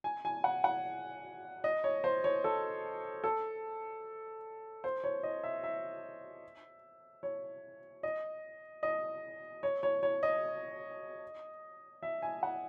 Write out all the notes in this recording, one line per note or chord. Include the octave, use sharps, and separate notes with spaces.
G#5
G#5
F#5
F#5
D#5
C#5
C5
C#5
A4
A4
C5
C#5
D#5
E5
E5
C#5
D#5
D#5
C#5
C#5
C#5
D#5
E5
G#5
F#5